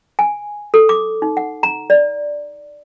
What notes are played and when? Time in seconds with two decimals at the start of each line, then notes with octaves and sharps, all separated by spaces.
0.19 G#5
0.74 A4
0.89 D6
1.22 D#4
1.37 F#5
1.63 A#5
1.90 D5